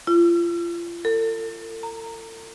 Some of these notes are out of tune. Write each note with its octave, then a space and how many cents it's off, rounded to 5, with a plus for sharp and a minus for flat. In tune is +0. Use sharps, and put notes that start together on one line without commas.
F4 -35
A4 +40
A#5 -15